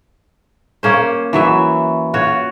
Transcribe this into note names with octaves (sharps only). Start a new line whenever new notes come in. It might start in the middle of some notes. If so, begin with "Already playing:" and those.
A#3 C#4 C5
E3 F#3 E5
F4 F#4 C#5